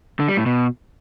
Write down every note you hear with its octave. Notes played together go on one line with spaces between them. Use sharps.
D3
G3
A2
B2